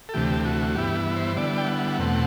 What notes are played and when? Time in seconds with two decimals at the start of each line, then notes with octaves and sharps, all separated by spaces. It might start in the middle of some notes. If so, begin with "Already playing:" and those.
0.09 A4
0.14 D2 C3 E3 A3 G4
0.45 F#4
0.75 G2 E3 B3 E4 G4
1.16 C5
1.37 D3 G3 B3 E4 D5
1.58 G5
1.68 F#5
1.98 E2 B2 A3 C4